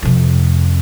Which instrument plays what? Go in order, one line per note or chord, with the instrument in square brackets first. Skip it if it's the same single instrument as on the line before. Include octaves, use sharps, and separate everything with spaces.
[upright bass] F2 C3